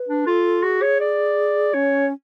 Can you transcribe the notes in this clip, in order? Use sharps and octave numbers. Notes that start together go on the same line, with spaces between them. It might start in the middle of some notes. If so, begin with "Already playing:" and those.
Already playing: B4
D4
F4 A4
F#4 G#4
C#5
D5
C#4 C#5